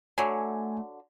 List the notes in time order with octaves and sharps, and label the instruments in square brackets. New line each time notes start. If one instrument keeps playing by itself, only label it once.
[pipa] D3 F#3 [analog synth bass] A3 [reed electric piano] G#5